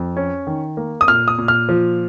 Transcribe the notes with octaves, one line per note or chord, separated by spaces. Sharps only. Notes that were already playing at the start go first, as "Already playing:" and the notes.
Already playing: F2
C#4
D#3
A#3
D#6
A#2 F6
D#6
A#2
F6
F3